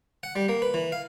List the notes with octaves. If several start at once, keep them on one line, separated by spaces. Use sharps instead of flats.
F#5
G3
A#3
B4
E3
F5